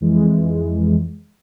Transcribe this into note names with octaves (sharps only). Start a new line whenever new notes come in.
F2 E3 G#3